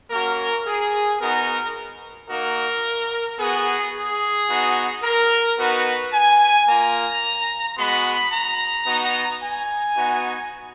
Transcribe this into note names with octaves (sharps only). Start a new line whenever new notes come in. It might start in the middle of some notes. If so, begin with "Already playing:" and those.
A#3 C#4 F#4 A#4
G#4
B3 D#4 F#4 A#4
A#3 D#4 F#4 A#4
B3 F#4 G#4
G#4
B3 D#4 F#4
A#4
B3 D#4 F#4 B4
G#5
A#3 F4 A#5
G#3 B3 F#4 B5
A#5
B3 D#4 F#4
G#5
B3 D#4 F#4